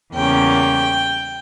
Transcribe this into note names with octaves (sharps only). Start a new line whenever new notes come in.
E2 C#3 G3 A#3 C#4 G5